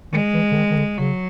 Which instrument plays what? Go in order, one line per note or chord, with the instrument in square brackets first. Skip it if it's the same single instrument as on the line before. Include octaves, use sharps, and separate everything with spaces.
[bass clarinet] D#3 [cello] G#3
[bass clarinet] E3
D3
D#3
D#3
D3
[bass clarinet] C#3 [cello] F#3